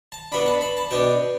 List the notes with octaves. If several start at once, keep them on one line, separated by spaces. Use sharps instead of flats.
A5
B2 B3 D4 B5
A5
B5
A5
B2 B3 D4 G5